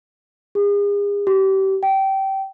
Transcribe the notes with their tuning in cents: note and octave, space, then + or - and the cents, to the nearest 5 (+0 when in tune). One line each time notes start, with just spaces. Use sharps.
G#4 -40
G4 -30
G5 -20